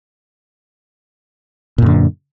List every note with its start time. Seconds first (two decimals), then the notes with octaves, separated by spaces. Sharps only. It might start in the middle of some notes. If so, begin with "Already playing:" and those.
1.78 A#2
1.82 F#2
1.86 D3